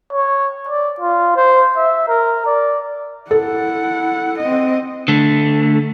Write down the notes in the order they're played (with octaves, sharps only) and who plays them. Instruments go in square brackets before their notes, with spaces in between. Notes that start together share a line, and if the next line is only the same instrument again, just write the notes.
[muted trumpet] C#5
D5
F4
C5
E5
A#4
D5
[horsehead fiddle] E4 F#5 [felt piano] A4
[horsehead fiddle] C4 D#5
[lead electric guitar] D3 A3